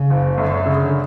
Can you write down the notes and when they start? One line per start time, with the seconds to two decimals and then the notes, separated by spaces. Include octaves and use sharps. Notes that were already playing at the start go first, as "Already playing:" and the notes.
Already playing: C#3
0.10 F#1
0.38 F#2 D3
0.66 C#3